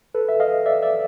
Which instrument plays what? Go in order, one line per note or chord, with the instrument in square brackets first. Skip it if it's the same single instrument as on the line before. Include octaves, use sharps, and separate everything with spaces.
[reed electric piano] A4 B4
E5
D#5 F5
D5 E5
D5 E5